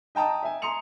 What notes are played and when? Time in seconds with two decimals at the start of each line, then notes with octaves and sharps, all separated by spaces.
0.15 D#5 G5 A5 A#5 D#6
0.43 E5 G#5
0.62 A#5 C6 D#6 C#7 F7